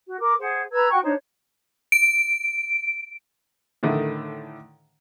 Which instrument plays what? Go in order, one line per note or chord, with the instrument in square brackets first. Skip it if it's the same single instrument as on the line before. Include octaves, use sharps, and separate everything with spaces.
[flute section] F#4
A#4 D6
G#4 C5 F#5
B4 A#5 E6 G#6
F#4 G5 C#6
D4 D#4 C5 C#5
[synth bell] D7
[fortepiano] A2 D3 D#3 A3